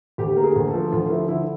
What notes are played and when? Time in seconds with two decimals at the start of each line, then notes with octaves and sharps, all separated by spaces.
0.18 D2 G4
0.37 A#3
0.44 G#4
0.56 D2
0.68 A4
0.74 F3
0.92 D2 F4
1.10 F3 E4
1.28 D3 E4